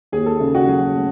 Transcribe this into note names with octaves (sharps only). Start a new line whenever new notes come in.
D#2 G#4
A4
C#3
F#4
F#3 G#4
A3